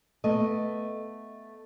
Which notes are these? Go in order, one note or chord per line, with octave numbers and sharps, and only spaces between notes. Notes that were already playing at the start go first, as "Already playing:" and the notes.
A3 B3 D#5